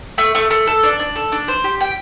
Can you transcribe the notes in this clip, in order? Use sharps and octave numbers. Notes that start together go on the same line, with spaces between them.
A3
A3
A3
A4
D4
D4
A4
D4
C5
G4
G5